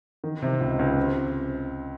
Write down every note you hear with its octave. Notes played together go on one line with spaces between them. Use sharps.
D#3
C3
C#2
C#2
C4